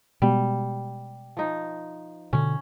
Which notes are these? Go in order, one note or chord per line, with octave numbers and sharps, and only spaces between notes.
B2 G3 G#3 B3
F3 D#4
B2 D3 C#4